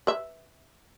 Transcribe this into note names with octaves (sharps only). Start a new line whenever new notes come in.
B4 E5